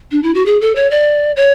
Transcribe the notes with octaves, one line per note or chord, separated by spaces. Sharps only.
D4
E4
F#4
G#4
A4
C#5
D5
C#5